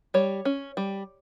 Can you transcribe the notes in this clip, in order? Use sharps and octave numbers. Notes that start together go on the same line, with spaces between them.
G3 C#5
C#4
G3